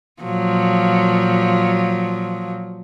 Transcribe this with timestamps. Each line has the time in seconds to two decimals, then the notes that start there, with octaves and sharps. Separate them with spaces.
0.22 A#2 F3 F#3